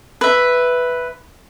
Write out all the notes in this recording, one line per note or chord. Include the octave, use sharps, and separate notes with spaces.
B4 E5